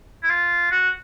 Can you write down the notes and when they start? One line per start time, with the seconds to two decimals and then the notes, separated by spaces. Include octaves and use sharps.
0.23 E4
0.29 F4
0.71 F#4